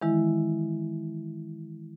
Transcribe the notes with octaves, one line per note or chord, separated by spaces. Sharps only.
D#3 E3 G#3 E4